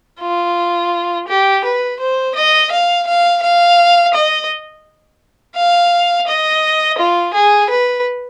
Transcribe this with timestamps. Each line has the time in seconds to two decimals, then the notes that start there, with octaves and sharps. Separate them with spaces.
0.21 F4
1.28 G4
1.64 B4
1.99 C5
2.35 D#5
2.71 F5
3.07 F5
3.42 F5
4.14 D#5
5.56 F5
6.27 D#5
6.99 F4
7.34 G#4
7.69 B4